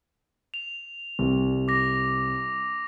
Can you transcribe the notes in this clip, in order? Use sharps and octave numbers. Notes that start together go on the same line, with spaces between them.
F7
C2
D6 A#6